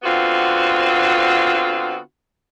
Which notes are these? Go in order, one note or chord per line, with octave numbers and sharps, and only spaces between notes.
D3 B3 C4 F4 F#4